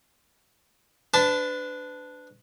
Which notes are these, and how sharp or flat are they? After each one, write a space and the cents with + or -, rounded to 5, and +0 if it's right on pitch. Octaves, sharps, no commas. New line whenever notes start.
D4 +0 B4 +35 A5 +0